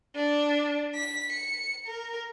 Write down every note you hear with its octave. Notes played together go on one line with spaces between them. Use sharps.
D4
B6
C#7
A#4